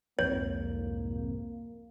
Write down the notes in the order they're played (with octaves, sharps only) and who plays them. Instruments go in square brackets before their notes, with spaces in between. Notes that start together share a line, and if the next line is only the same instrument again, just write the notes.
[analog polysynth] C2 F2 G#2 [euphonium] A#3 [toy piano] C#5